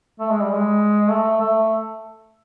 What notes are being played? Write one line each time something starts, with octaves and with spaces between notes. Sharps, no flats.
A3
G#3
G3
G#3
A3
A3